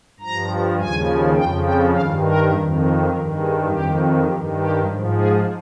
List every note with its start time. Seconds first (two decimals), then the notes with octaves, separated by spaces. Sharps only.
0.20 G2 F3 A#5
0.78 D#2 C#3 F3 G#5
1.36 F2 C#3 F3 G5
1.64 G5
1.93 G2 D#3 F5
2.22 A#4
2.51 F2 D#3
2.80 A#4
3.09 G2 D#3 A#4
3.38 G#4
3.66 F2 D#3 G4
4.24 G2 D#3 G4
4.54 G4
4.83 G#2 F3
5.11 G#4